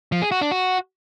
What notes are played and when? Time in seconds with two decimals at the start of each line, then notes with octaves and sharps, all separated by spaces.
0.12 F3
0.22 G#4
0.32 F#4
0.41 D4
0.51 F#4